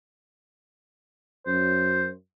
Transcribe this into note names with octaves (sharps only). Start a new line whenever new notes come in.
F#2 C5